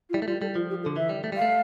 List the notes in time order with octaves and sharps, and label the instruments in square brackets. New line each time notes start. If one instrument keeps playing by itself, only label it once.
[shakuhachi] F4
[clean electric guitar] G3 [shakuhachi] E4
[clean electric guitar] A3
[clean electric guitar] G3 [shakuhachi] F4
[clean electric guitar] G3 [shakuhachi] A4
[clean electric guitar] F3 [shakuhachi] F4
[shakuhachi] G4
A4
[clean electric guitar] D3
[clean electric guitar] E3 [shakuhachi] E5
[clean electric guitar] G3
A3
G3
[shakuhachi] F5
[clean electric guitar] A3